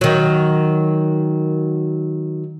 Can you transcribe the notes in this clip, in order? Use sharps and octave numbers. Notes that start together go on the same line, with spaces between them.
D#3 F#3